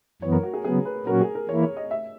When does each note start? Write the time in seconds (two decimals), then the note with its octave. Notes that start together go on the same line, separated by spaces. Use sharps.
0.22 F#2 E3 B3 C#5
0.32 A#4
0.43 F#4
0.53 G#4
0.64 C#3 F#3 B3 G#4
0.85 B4
1.06 A#2 F#3 C#4 F#4 A#4
1.21 G#4
1.35 A#4
1.49 E3 A#3 E4 C#5
1.63 C#5
1.77 D#5
1.91 E5